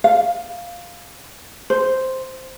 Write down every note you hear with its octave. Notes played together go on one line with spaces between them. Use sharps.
F5
C5